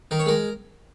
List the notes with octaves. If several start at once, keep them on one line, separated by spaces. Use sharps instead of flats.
D#3 A#4
C#5
G#3 A#4